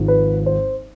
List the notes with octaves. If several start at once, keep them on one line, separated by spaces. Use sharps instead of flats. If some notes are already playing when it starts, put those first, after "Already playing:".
Already playing: G#1 G#2 F3
B4
C5